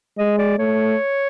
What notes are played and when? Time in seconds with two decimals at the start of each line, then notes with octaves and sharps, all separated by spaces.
0.18 G#3 D#5
0.38 D5
0.58 A3 C#5